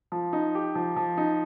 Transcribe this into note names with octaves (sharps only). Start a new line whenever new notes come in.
F3
D#4
G4
F3
F3
D#4